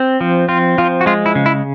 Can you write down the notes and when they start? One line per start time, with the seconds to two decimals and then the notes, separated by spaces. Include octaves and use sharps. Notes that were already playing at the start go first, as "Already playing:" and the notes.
Already playing: C4
0.21 F3
0.48 C4 F4
0.78 F3 F4
1.01 F#4
1.06 G#3 F4
1.26 E4
1.35 C#3
1.46 E4